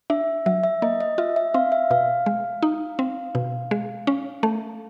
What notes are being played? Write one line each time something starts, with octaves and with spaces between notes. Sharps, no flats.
D4 E5
F#3 E5
E5
A#3 D#5
D#5
F4 E5
E5
C4 F5
E5
B2 F5
G#3
D#4
C4
B2
G#3
C#4
A3